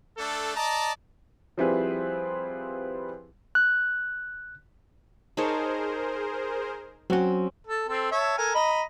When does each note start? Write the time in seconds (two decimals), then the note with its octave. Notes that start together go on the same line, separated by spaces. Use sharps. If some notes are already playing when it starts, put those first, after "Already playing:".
0.18 A3 D4 A4
0.56 D5 D#5 A5 A#5
1.57 F3 G3 C4 E4 G#4 B4
3.55 F#6
5.37 D#4 G#4 A#4 C5 C#5 A5
7.10 F#3 C4 C#4 F#4
7.67 A4
7.88 C4 A4
8.12 C#5 E5 A5
8.38 A4 A#4 G#5
8.55 D#5 A#5 B5